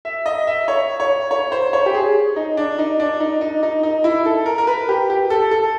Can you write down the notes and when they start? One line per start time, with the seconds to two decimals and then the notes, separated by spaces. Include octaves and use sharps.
0.05 E5
0.26 D#5
0.47 E5
0.68 C#5
1.00 C#5
1.31 C#5
1.52 C5
1.73 C#5
1.86 G4
1.94 G#4
2.36 D#4
2.57 D4
2.78 D#4
3.00 D4
3.20 D#4
3.41 D#4
3.63 D#4
3.83 D#4
4.04 E4
4.26 A4
4.46 A#4
4.58 A#4
4.67 B4
4.89 G4
5.10 G4
5.30 A4
5.51 A4